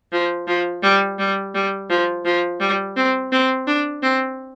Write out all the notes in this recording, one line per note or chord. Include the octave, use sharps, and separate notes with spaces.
F3
F3
G3
G3
G3
F3
F3
G3
C4
C4
D4
C4